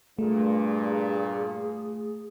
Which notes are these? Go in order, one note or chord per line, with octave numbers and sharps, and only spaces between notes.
G2 A#2 A3 G#4